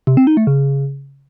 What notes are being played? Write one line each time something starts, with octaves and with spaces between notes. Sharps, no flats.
C3
C4
D#4
A3
C#3